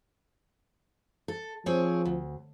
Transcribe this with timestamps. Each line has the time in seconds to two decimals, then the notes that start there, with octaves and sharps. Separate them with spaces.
1.28 A4
1.66 F3 C4 G#4 C#5
2.05 D2